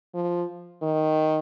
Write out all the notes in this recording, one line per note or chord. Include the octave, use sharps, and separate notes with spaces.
F3
D#3